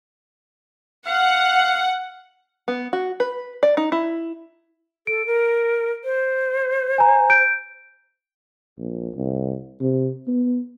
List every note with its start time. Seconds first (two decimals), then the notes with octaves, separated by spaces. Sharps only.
1.06 F5 F#5
2.68 B3
2.93 F#4
3.20 B4
3.63 D5
3.77 D#4
3.92 E4
5.07 A4 D7
5.27 A#4
6.04 C5
6.98 G#5 A#5
7.30 G6 D7
8.78 A#1
9.15 C2
9.81 C3
10.28 B3